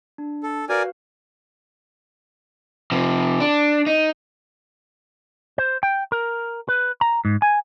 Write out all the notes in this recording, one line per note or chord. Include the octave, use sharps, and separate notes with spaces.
D4
A4
F#4 A#4 B4 D5 F5 G#5
C3 F3
D4
D#4
C5
G5
A#4
B4
A#5
G#2
G#5